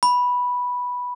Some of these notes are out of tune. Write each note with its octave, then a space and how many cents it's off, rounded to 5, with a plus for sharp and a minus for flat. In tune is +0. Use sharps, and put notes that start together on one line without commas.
B5 -5